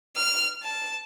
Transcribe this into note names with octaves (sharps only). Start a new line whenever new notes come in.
F6
A5